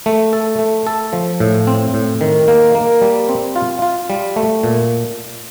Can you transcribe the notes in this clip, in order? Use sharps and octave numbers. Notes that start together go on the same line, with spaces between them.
A3
A4
A3
A4
F3
A2
C4
A2
D#3
A#3
A#3
G3
C4
F4
F4
G3
A3
A#2